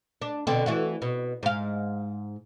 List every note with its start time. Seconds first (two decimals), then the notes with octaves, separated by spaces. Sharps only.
0.22 D4
0.47 B2 D3 C4
0.66 E3 A3 F#4
1.02 B2
1.43 G#2 F5